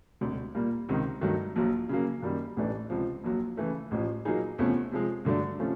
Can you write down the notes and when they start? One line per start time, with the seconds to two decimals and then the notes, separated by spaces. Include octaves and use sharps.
0.21 E1 D2 C3
0.55 A#2 G3 A#3
0.89 C#2 C3 D#3
1.21 G2 D#3 F#3 A3
1.56 A#1 A#2 F#3
1.89 C#3 F#3 A#3
2.22 F#2 D#3 G3 A#3
2.57 A1 A2 E3 A3 D4
2.90 C#2 C3 F3
3.24 A#1 A#2 F#3
3.57 C#3 E3 A3
3.91 A1 A2 F3
4.25 A#2 F#3 A#3 D#4 G#4
4.58 E2 C3 F3 A3 C#4
4.92 C3 F3 G#3
5.25 G2 D3 F#3 A3 D4
5.59 C3 F3 A3 C#4 F4